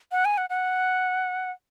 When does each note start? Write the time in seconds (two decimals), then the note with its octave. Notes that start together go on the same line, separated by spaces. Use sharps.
0.12 F#5
0.25 G#5
0.38 F#5
0.50 F#5